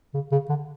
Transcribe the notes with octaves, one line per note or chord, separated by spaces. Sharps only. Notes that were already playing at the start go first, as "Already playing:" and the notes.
C#3
C#3
D3